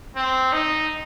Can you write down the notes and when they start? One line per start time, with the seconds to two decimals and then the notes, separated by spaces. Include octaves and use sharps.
0.16 C4
0.53 D#4